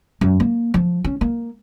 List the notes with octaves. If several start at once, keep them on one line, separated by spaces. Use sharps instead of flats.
F#2
A#3
F3
C#4
A#3